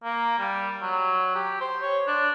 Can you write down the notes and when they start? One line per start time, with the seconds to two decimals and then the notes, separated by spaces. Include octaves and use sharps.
0.04 A#3
0.39 G3
0.82 F#3
1.35 G4
1.61 C5
1.82 C#5
2.07 D4